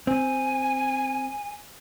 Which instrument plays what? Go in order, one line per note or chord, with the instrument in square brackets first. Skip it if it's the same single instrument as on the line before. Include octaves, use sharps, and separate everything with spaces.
[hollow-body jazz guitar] C4 [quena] G#5